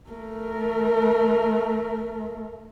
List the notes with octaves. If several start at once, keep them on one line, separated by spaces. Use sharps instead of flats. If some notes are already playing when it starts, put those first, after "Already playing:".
A3 A#4